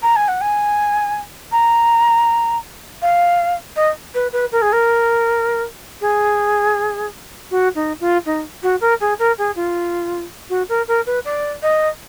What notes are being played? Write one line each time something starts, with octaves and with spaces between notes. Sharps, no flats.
A#5
G#5
F#5
G#5
A#5
F5
D#5
B4
B4
A#4
G#4
A#4
G#4
F#4
D#4
F4
D#4
F#4
A#4
G#4
A#4
G#4
F4
F#4
A#4
A#4
B4
D5
D#5